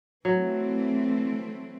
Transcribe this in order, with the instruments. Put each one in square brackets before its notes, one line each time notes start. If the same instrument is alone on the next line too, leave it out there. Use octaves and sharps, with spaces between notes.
[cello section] E3 A3 C4 [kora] F#3